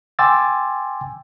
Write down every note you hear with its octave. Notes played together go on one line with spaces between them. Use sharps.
G5 G#5 C6 D6 E6 A6